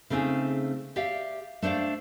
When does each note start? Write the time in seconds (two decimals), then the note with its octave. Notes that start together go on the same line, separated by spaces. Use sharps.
0.10 C#3 A3 C4 D#4 G#4
0.96 G4 D5 E5 F5
1.62 A3 D4 C5 D5 F5